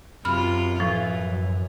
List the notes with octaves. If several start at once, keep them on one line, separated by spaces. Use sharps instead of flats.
F#2 C3 F4 B5 F6
A2 E3 F3